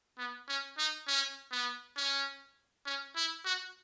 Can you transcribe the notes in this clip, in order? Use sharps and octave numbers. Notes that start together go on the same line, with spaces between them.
B3
C#4
D#4
C#4
B3
C#4
C#4
E4
F#4